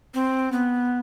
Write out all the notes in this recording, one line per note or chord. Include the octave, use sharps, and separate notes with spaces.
C4
B3